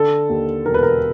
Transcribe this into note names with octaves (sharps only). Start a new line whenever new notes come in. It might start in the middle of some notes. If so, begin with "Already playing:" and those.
Already playing: D3 A4
D#2
E1 A#4
B4
A#4